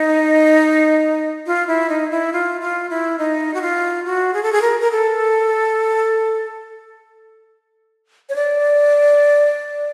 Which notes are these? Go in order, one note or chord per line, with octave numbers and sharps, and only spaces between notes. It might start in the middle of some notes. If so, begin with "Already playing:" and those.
Already playing: D#4
F4
E4
D#4
E4
F4
F4
E4
D#4
F#4
F4
F#4
G#4
A4
G#4
A#4
A#4
A4
C#5
D5